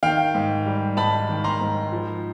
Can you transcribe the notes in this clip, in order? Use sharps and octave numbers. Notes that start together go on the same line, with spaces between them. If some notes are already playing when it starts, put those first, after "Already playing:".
D#3 F5 G5
G#2
G3
G#2 A5 B5
D#3
A#5 C6
G#2
F3